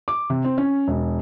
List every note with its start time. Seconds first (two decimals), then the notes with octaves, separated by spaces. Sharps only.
0.08 D6
0.30 C3
0.45 C4
0.58 C#4
0.88 E1